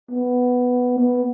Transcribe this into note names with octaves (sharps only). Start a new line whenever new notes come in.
B3
B3